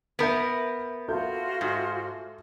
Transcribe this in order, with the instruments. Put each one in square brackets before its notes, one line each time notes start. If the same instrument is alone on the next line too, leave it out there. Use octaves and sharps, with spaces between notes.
[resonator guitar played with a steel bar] B3 A#4 [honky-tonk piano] E5 G6 D7
[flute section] F4 F#4 [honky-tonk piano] A4 E5 G6
[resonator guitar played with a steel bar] G#2